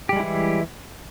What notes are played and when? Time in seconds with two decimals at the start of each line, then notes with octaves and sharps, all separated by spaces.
0.09 G4
0.13 G3
0.16 G#3
0.20 E4
0.23 E3